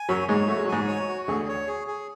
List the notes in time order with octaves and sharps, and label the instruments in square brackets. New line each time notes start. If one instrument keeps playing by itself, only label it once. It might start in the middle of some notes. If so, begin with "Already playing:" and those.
Already playing: [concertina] G#5
[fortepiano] F#2 F#3 [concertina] C#5
[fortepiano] G#2 G#3 [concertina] C#5
[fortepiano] A3 [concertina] F#4
[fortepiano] G#3
F#3
[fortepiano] G#2 G#3 [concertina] G#5
[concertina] C#5
F#4
[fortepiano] D2 D3 [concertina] G#4
[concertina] C#5
G#4
G#4